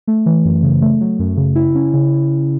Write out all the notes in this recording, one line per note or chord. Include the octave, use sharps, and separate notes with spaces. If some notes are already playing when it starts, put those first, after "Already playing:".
A3
E3
F#2
C#3
A3
F#3
F#2
C#3
E4
C#4
C#3